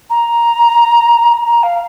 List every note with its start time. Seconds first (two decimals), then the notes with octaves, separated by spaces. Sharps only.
0.10 A#5
1.46 A#5
1.63 F5